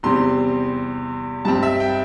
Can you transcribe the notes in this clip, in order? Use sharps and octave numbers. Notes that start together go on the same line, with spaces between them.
E2 C3 G3 C4 C6
G2 G3 C4 A5
E5
G5